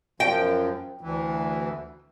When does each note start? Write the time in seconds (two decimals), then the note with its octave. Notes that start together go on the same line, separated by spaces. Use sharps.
0.20 F#2 F3 G5
1.01 D2 E3